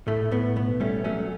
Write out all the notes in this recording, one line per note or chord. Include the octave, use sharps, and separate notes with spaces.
A2 A3
A2 B3
B1 B3
G3 A3 C#4
F#3 A3 C#4